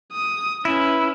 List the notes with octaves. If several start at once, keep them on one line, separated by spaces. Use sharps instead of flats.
D#6
C#4 E4 B4